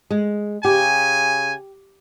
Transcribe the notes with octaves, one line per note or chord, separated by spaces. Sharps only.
G#3
C#3 G4 G#5